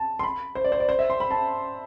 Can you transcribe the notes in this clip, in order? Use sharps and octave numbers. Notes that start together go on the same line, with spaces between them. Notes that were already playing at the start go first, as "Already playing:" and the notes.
Already playing: A5
C6
B5
C5
D5
C5
D5
C5
E5
C6
B5
A5